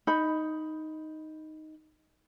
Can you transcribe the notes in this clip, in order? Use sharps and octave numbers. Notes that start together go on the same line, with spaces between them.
D#4 B5